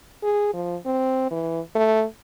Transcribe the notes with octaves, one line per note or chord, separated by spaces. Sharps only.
G#4
F3
C4
E3
A3